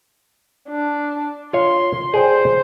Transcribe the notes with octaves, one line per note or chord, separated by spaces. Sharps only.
D4
F4 C#5 C6
G#4 C5 D5 G5